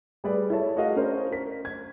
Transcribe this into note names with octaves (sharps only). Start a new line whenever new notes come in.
G3 G#4 B4 D5
E4 A4 C#5 A5
F4 F#4 G#4 A#4 D#5 F5
C#4 D4 A#4 C5
A#4 B6
G#6